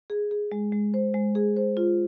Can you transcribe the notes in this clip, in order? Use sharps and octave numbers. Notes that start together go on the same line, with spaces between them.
G#4
G#4
G#3
G#3
C5
G#3
G#4
C5
F4